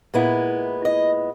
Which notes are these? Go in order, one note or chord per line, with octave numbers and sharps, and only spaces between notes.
A#2 G#3 B3 E4
D#5